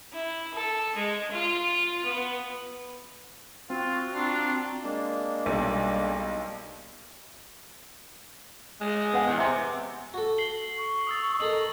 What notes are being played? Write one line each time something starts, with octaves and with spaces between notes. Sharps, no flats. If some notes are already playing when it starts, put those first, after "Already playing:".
E4
A4
G#3
F4
B3
C4 F4 F#4
D4 F4 A#5
G#3 A#3 D4
B1 G3
G#3
B3 F#5 G#5
E2
C3 E5
F#4 A4
C7 F#7 G7
C#6
D#6 E6 A6
C#4 A4 A#4 D#5 F#7